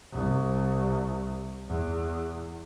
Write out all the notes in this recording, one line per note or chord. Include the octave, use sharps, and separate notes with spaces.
C2
E2